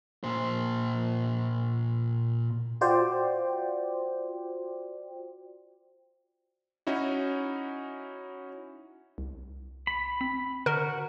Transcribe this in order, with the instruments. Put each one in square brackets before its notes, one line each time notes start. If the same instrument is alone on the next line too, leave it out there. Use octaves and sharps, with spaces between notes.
[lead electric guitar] A#2 C5
[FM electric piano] F4 F#4 C5 D5 G5
[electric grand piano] C#4 D#4 E4 F#4
[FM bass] C2
[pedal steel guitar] B5
[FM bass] C4 [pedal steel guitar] B5
[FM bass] D3 [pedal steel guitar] F#4 [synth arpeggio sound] A#4